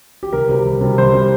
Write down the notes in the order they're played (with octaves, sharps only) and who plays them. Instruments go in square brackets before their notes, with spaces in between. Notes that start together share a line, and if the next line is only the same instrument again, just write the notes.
[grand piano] G4
C2 A#4
C3 G3
C2
C3 G3
C2 C5
C3 G3